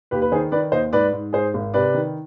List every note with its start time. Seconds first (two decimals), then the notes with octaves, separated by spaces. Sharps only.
0.11 D#2 G4 B4
0.22 B4
0.32 D#3 G#4 C5
0.52 D#3 B4 D5
0.72 D#2 C5 D#5
0.93 G#2 B4 D5
1.13 G#2
1.33 G#2 G#4 C5
1.54 G#1
1.74 C3 B4 D5
1.94 D#3